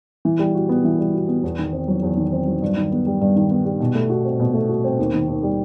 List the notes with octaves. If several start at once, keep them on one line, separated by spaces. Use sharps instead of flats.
E3
G3
F#4
B3
E3
G3
F#4
B3
E2
D#3
C4
F#3
E2
D#3
C4
F#3
G2
D#3
B3
G3
G2
D#3
B3
G3
B2
A3
F#4
C4
B2
A3
F#4
C4
D#2
D#3
D#2
G3